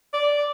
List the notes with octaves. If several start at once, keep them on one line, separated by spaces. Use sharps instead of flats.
D5